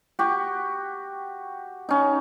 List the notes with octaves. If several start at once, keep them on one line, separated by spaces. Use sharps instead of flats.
F#4 G4
C#4 D#4